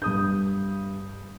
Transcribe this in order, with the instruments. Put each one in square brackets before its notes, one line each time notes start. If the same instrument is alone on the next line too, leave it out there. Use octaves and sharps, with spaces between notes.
[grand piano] G2 D#6 G6